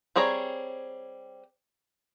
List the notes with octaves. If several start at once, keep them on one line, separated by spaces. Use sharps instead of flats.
G3 C4 G#4 C#5 A#5